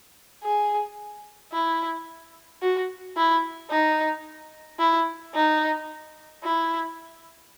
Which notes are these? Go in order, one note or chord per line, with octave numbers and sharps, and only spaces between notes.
G#4
E4
F#4
E4
D#4
E4
D#4
E4